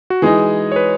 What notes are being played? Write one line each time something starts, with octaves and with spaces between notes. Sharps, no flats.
F#4
E3 G#3 D#4 G#4
C#5
B4